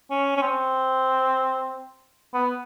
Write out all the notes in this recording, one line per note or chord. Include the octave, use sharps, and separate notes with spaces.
C#4
C#4
C4
B3